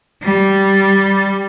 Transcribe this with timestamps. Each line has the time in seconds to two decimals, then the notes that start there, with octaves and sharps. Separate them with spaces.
0.23 G3